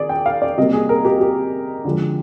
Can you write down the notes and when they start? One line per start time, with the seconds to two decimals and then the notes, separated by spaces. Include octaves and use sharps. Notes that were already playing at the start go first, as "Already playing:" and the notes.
Already playing: D#3 G#4 D5
0.09 G5
0.26 F5
0.42 D5
0.58 C3 G3 A#3 D#5
0.73 G#4
0.89 A#4
1.05 G4
1.21 G4
1.85 D3 F3 G#3